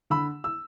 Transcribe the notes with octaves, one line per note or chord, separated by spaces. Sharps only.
D3 B5 E6
E6